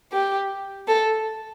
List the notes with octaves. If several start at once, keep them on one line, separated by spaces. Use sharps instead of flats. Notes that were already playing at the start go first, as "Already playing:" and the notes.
G4
A4